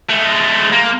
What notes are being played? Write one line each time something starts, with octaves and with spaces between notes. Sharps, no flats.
G#3 A3
A#3